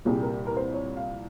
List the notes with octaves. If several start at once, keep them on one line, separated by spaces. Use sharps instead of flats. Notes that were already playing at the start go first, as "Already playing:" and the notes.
C2 A#2 G3 G#4
A#4
A#4
C5
C#5
F5